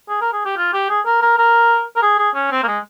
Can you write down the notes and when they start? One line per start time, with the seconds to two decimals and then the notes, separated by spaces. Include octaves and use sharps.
0.09 G#4
0.21 A#4
0.33 G#4
0.45 G4
0.57 F4
0.73 G4
0.89 G#4
1.06 A#4
1.22 A#4
1.38 A#4
1.96 A#4
2.02 G#4
2.19 G#4
2.35 C#4
2.51 C4
2.63 A#3
2.68 G#3